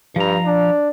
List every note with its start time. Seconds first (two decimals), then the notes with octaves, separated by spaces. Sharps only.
0.16 G2 F3 A#5
0.46 D4